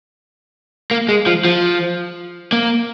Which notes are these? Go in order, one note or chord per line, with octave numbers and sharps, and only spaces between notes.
A#3
G#3
F3
F3
A#3